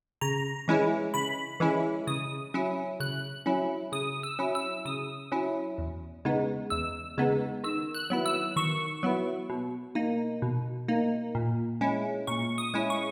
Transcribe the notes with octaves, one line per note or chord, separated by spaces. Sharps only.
C#3 A#5
E3 G#3 C#4 E4
C#3 B5
E3 G#3 C#4 E4
C#3 D#6
F#3 C#4 E4
C#3 F#6
F#3 C#4 E4
C#3 D#6
E6
F#3 C#4 E4
E6
C#3 D#6
F#3 C#4 E4
E2
C#3 G#3 B3 D#4
E2 E6
C#3 G#3 B3 D#4
D#3 E6
F#6
F#3 B3 E4
E6
D#3 C#6
F#3 B3 E4
B2
A#3 D#4
B2
A#3 D#4
A#2
G#3 C#4 E4
A#2 C#6
D#6
G#3 C#4 E4
C#6